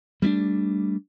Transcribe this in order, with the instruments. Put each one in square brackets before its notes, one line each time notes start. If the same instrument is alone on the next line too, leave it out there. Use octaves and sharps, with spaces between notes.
[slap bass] G3 A3 B3 D4